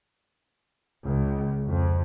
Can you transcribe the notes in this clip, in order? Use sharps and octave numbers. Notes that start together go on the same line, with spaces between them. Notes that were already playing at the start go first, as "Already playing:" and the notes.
C#2
F2